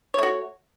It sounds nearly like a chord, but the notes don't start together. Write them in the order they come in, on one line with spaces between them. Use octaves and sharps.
C#5 A3 F#4